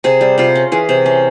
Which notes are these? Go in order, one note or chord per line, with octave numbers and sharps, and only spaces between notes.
C3 G#4
G3
C3 F4
C#4
E3 G#4
C3
C#4